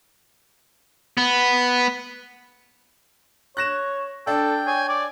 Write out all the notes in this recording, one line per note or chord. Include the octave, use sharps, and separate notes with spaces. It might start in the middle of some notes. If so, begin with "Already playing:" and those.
B3
C#5 F#6 A#6 E7
D4 A4 G5
C#5 G#5
D5 G#5